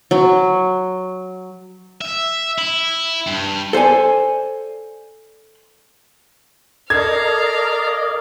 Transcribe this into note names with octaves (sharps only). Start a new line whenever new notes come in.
F#3
E5
E4
G2
A4 C5 D5 G#5
A4 A#4 D5 D#5 F5 A#5 G#6